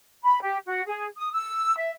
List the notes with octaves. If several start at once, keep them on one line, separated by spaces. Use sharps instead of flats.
B5
G4
F#4
G#4
D#6
E6
E5